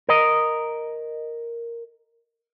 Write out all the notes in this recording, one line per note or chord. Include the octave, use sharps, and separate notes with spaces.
A#4 D#5